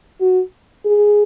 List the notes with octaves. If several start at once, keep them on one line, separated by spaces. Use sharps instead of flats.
F#4
G#4